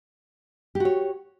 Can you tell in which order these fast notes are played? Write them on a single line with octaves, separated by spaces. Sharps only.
G4 F#4 C#5